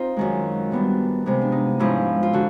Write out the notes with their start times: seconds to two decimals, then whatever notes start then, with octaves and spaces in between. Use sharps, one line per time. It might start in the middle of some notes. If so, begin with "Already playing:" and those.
Already playing: C4 D#4 F4
0.16 F#2 D#3 G#3
0.71 G#2 D#3 G3 B3 D4
1.26 C3 F3 G#3 B3
1.41 D4
1.52 D#4
1.79 G#2 F3 G#3 C#4 E4
2.23 F4
2.33 D3 F#4